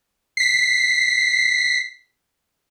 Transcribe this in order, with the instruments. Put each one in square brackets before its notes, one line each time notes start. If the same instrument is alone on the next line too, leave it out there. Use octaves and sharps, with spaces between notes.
[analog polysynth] B6 C7